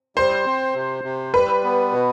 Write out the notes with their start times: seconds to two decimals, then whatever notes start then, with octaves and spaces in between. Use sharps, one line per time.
0.16 G3 C5
0.46 C4
0.75 C3
1.04 C3
1.34 G3 B4
1.64 B3
1.92 B2